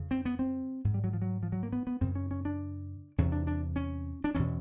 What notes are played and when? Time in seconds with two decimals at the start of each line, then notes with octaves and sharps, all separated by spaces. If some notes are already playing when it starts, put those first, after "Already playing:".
Already playing: F2 C#3
0.11 C4
0.25 B3
0.39 C4
0.84 G#2
0.94 G3
1.04 F#3
1.13 F3
1.22 F#3
1.43 F3
1.52 F#3
1.63 A#3
1.73 B3
1.87 B3
2.01 F#2 C#3 C4
2.15 C#4
2.31 C#4
2.45 D4
3.18 E2 C3 C#4
3.32 D4
3.47 D4
3.76 C#4
4.24 D4
4.35 E2 B2 C#4